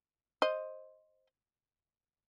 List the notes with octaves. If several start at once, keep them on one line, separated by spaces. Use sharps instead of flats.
C5 D#5